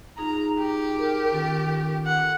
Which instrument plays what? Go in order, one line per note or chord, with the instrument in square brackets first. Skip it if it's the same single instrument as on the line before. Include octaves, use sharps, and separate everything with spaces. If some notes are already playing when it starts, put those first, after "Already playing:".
[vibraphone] D#4 F4 G#4 [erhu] A#5
[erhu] G4
[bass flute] A#4
[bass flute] D#3 [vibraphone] C#4 F4 A4
[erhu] F#5